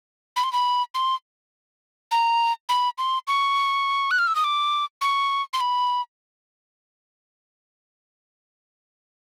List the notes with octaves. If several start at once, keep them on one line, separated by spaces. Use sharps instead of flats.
B5
C6
B5
C6
A#5
B5
C6
C#6
F#6
F6
E6
D#6
D6
C#6
C6
B5